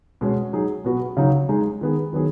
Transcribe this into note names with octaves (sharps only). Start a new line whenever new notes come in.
B2 G#3 C#4
F#3 D#4 G#4
B2 B3 F#4
C#3 F#3 D#4 F#4
G#3 D#4 G#4
D#3 B3 G#4
D#3 F#3 B3 G#4